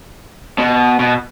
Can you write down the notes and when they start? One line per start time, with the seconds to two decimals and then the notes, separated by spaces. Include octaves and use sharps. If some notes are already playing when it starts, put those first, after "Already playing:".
0.58 B2
1.00 B2